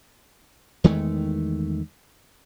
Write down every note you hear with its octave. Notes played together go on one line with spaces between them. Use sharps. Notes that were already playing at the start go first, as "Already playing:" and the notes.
E2 D#3 G#3 A3